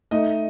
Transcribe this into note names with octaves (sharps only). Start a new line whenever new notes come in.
A3 D#4 D#5